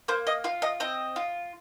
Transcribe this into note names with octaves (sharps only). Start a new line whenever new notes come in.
A#3 C5
D#5
F4 F5
D#5
C4 D#5
F4